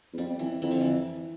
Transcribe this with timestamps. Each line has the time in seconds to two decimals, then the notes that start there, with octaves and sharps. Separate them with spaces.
0.13 E2
0.18 F2 G3
0.39 F2 E3
0.62 F2 E3
0.71 D3
0.81 E3